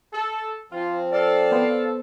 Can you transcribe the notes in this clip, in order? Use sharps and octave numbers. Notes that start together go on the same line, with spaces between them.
A4
F3 C4 F4
A4 D5 F5
B3 C5